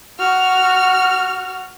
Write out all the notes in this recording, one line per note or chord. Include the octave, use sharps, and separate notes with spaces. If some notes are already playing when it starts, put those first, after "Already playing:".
F#4 F6